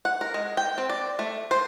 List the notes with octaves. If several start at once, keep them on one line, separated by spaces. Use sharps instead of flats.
F#5
A#4
G#3
G5
C4
D5
A3
C5